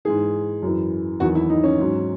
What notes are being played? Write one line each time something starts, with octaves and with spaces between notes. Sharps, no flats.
G#2 E3 G#4
F#2 E3
E2 D#3 F#3 F#4
E4
D#4
C#4
G#2 F#3